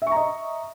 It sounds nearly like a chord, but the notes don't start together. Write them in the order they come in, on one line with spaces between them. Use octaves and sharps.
E5 C#6 A#5 D#5